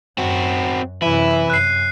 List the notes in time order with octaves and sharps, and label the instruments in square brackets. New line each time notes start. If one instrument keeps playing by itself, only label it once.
[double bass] F#2 [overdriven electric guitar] C4 F#4
[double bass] F#2 C3 [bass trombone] E3 [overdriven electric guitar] E4 [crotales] D#7
[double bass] F#2 [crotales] F#6 C7